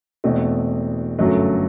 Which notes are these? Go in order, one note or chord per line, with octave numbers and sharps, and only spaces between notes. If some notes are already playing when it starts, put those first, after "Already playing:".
E1 E2 B2 A3 C4
G1 F#2 F#3 A3